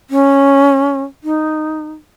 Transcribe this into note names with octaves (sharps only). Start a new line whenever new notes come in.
C#4
D#4